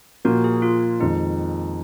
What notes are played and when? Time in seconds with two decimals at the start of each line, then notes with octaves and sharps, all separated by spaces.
0.25 A#2 F3 A#3 F#4
0.44 G#4
0.62 F4
1.00 F2 D#3 G#3 D#4